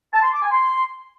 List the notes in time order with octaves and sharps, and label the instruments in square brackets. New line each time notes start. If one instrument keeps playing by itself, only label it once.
[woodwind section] A5
C6
D6
G#5
C6